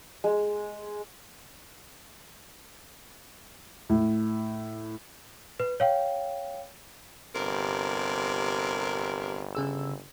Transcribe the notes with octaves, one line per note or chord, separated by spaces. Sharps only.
G#3
A2
B4
C#5 F5 G5
G1 C3 A#4
C#3 G#4 E6